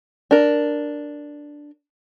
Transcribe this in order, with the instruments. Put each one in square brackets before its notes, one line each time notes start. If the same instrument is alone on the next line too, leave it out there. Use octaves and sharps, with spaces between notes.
[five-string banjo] D4 A#4